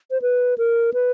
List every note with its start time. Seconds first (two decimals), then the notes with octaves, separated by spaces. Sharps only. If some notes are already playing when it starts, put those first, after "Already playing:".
0.11 C5
0.22 B4
0.58 A#4
0.94 B4